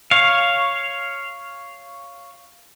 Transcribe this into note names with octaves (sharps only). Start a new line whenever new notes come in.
C#5 F5